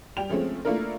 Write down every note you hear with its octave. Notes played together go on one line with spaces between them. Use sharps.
G3 G5 F7
F3 G#3 A3 C4 C#4
A3 A#3 D4 E4 F4 A#4